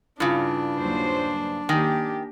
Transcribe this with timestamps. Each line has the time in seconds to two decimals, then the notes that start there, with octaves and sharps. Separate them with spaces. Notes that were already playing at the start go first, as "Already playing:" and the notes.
0.20 G2 C#3 D4 E4 F4
0.79 D#2 F#3 C5
1.69 D#3 A#3 G4 G#5 A#6